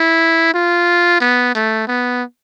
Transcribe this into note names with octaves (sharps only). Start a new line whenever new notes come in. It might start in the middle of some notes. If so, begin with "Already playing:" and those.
Already playing: E4
F4
B3
A3
B3